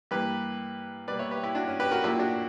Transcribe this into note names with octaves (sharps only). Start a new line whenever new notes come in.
G2 E3 A#3 G4 B4
B2 G3 A#3 B4 D5
C#5 E5
G4 B4
E4 G4
D4 F#4
C#4
G4 B4
F#4 A#4
A#2 F#3 A#3 E4 G4
D4 F#4